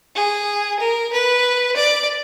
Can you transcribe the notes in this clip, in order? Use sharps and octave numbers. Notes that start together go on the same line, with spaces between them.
G#4
A#4
B4
D5